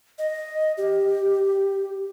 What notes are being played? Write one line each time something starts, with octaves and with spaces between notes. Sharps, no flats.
D#5
G4